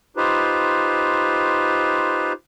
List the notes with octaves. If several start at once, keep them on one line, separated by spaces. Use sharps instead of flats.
D#4 F4 G4 B4 C5